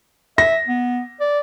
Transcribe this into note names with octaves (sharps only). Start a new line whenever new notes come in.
E5 A#6
B3
D5